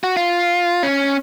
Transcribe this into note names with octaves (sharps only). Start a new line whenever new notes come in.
F#4
F4
C#4